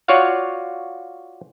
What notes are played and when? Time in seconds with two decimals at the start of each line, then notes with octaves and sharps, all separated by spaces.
0.08 F4 F#4 C#5 D5 F5 F#5